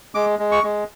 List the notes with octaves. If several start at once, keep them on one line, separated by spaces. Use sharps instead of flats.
G#3 D6
G#3
C#6
G#3